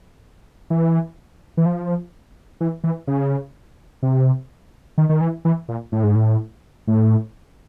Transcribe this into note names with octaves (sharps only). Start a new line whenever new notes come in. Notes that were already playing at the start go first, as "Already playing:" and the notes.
E3
E3
F3
E3
E3
C#3
C3
D#3
D#3
E3
E3
A#2
A2
G#2
A2
A2